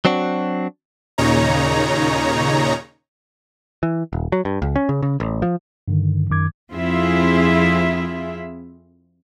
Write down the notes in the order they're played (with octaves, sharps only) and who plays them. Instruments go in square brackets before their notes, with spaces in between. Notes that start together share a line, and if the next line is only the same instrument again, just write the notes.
[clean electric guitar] F#3 C4 D4 F#4
[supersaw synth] D#2 A#2 C#3 D#4 C#5 A#5
[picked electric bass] E3
D#1
F#3
G2
C#2
C#4
C#3
C#3
A1
F3
[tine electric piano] G2 D3 D#3
F#2 D#3 D6 G#6
[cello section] F2 C4 E4 F4 G#4 E5